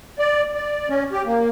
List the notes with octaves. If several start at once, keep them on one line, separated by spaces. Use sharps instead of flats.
D5
D5
C#4
G4
A#3